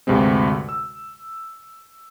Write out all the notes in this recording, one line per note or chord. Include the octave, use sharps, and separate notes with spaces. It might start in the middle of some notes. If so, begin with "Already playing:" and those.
D2 G2 C3 G#3 C4
E6